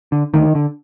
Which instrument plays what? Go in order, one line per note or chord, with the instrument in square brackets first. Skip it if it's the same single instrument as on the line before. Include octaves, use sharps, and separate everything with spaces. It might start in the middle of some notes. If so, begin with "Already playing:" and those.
[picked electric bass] D3
D2 D#3
D3